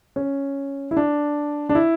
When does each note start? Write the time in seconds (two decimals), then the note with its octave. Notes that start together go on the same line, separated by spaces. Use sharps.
0.16 C#4
0.91 E4
0.97 D4
1.69 D4
1.75 E4